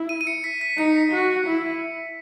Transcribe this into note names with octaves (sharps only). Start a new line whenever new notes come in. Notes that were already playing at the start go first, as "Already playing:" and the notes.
Already playing: E4
D#7
D#7
C#7
B6
B6
D#4 C#7
F#4
E4